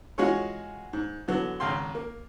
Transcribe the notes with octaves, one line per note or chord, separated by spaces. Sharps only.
E3 G#3 F4 F#4 G#4 C#5
G#2
D3 E3 F#3 B3
G#1 C#2 F5 G5 C6
A#3